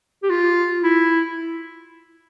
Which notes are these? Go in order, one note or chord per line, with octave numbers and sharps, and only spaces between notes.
G4
F4
E4